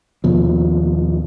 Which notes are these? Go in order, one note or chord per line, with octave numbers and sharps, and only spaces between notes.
D#2 B2 F3